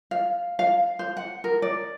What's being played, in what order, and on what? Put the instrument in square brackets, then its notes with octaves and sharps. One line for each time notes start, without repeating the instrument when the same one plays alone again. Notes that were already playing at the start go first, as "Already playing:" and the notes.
[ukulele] F5
F5
C5
F#5
A#4
D5